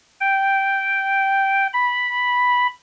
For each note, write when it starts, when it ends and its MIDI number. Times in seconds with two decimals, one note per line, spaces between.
0.20 1.67 79
1.73 2.67 83